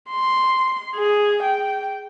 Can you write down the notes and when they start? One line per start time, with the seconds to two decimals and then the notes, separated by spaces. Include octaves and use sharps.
0.10 C6
0.96 G#4
1.43 G5